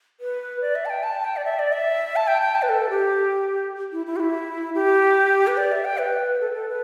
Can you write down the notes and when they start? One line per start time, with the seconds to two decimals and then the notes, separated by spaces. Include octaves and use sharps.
0.20 B4
0.62 D5
0.75 E5
0.86 A5
0.90 G5
1.03 A5
1.24 G5
1.37 D5
1.45 E5
1.59 D5
1.73 E5
2.16 A5
2.27 G5
2.42 G5
2.55 A5
2.62 B4
2.69 A4
2.90 G4
3.92 E4
4.06 E4
4.16 G4
4.20 E4
4.75 G4
5.47 B4
5.57 D5
5.72 E5
5.85 G5
5.99 B4
6.41 A4
6.54 A4
6.68 B4